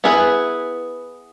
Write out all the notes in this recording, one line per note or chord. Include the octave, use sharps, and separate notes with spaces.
B3 E4 G#4 B4